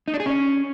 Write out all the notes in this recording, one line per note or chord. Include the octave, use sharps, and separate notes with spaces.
D#4
D4
G#4
C#4